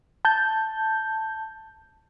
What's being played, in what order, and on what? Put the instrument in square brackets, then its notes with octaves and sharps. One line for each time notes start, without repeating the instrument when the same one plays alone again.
[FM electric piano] A5 G6